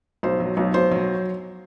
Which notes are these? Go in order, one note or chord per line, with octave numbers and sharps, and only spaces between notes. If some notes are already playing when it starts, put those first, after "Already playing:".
B1 C5
F#3
B1
B1 C5
F#3